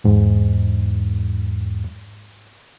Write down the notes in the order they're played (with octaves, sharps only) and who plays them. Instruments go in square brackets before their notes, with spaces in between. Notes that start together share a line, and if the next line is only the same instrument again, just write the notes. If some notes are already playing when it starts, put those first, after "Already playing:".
[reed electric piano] E2 G#2